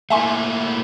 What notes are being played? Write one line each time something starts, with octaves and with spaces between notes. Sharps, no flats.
A3 A#3 E4 E5 G#5 C6